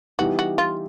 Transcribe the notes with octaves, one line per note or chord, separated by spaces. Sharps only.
E3 G3 B3 D#4 F#4 G4
F#4
F4